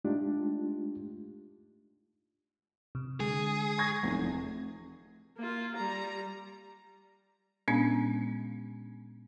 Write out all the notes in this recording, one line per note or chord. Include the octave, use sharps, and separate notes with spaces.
G#3 A3 D4 D#4 F4 G4
C3
D3 G#3 G#4
C#6 G#6 A#6
F1 E2
A#3 F4
G3 A#5
A#2 G#3 B3 C#4 D4